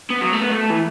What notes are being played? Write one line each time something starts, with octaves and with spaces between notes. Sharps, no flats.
B3
F#3
A3
B3
A3
E3